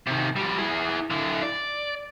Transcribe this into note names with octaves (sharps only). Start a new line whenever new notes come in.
C3 D#3
F3 G3
E4 G#4
D3 E4
D5